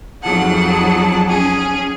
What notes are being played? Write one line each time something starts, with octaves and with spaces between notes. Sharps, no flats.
F2 F#3 D#4 G#4 F#5 A5
C#4 G#4 G#5